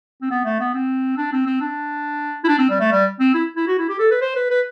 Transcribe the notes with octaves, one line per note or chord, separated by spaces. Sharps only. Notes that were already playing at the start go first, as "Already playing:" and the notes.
C4
B3
A3
B3
C4
D4
C4
C4
D4
E4
D4
C4
G3
A3
G3
C4
E4
E4
F#4
E4
G4
A4
B4
C5
B4
B4